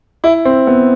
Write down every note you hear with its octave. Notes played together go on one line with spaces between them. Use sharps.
E4
C4
B3